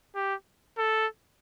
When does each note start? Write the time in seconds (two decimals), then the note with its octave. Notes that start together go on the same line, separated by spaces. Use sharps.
0.15 G4
0.78 A4